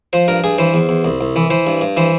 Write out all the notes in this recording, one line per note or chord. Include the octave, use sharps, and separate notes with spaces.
F3 C5
G2 A#4
G2 G#4
E3 C5
E2
E2
C2
C2
E3
E3 C5
G2
G2
E3 C5